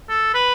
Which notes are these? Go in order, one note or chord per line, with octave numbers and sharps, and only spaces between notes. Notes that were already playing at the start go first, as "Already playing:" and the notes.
A4
B4